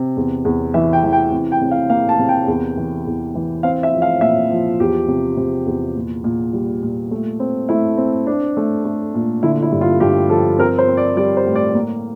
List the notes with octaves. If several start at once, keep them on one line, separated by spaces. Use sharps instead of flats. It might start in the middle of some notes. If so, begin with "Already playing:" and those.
Already playing: C3
E2
E2
E3 E5
G5
E3
G5
C3
G5
C3
F5
A#3 F5
A5
C3
G5
E2
E3
E2
E3
C4 F5
E5
F3
F5
A#2 E5
F3
E2 G4
C3
C3
E2
A#2
A#2
G3
A#2
A3
C4
A3 E4
C4
C4 D4
A3
A3
A#2
D3 E4
E4
G2
F4
G2 G4
F3 A4
C4 A#4
C5
C4
D5
G3 D5
C5
A2
D5
A#3